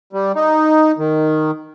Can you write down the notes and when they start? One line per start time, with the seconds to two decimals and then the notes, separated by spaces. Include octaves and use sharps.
0.13 G3
0.36 D#4
0.98 D#3